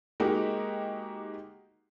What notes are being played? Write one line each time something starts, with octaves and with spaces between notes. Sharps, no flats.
G#3 A#3 D#4 F#4 G4